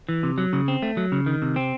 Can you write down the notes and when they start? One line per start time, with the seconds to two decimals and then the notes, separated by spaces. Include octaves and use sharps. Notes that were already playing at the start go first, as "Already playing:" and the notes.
0.09 E3
0.23 C3
0.38 F#3
0.53 C#3
0.68 C4
0.82 A3
0.97 F#3
1.12 C#3
1.26 D#3
1.42 C3
1.56 C4